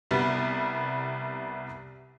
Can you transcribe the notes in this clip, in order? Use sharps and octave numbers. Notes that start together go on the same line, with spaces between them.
C2 G3 B3